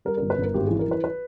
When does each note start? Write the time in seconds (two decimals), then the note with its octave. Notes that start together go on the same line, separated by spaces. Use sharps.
0.05 G3 A#4
0.18 G1 A#4
0.30 B4
0.38 G1 A#4
0.54 G#1 G4
0.67 E3 G#4
0.79 A#4
0.88 E3 B4
1.04 B4